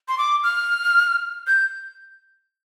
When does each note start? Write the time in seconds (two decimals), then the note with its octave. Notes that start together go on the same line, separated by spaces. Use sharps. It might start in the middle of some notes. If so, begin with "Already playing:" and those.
0.08 C6
0.18 D6
0.43 F6
1.47 G6